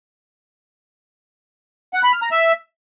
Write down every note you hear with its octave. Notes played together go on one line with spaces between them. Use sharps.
F#5
B5
F6
A#5
E5